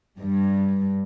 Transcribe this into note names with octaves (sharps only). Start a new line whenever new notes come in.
G2